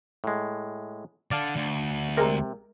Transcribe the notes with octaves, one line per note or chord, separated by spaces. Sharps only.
A2 G#3
D3 D5 F5 A5
D2
C3 G#3 A#4